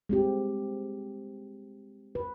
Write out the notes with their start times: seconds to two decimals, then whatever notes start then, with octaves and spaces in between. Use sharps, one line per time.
0.09 G#3 C4 G4
2.15 B4